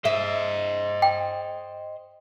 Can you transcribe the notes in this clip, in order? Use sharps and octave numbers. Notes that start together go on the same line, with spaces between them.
C5 D#5 E5
G5